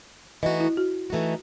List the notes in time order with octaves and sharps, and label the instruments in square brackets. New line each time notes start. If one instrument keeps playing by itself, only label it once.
[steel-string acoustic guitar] E3 A3 D#4 F#4 [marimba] D#5
[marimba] E4
F#4
[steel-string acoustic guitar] E3 A3 D#4 F#4